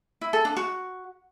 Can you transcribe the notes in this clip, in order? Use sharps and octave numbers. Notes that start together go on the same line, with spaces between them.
E4
A4
D4
F#4